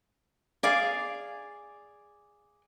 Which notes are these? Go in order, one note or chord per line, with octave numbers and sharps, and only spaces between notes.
G#4 D5 F5